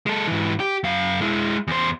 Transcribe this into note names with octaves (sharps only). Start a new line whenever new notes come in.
G#3 A4
G#2 E3
G4
F#2 F5
G#3 E4
E2 C5